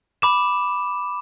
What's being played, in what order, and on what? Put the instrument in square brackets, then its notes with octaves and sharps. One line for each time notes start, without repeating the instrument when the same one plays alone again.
[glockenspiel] B5 D6 E7